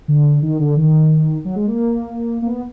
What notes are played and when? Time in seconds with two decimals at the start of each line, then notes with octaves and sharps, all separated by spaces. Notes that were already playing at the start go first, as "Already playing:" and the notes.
0.08 D3
0.42 D#3
0.59 D3
0.77 D#3
1.45 F#3
1.56 G#3
1.67 A#3
2.42 A#3
2.47 B3